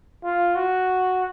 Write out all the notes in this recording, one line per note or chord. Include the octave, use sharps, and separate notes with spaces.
F4
F#4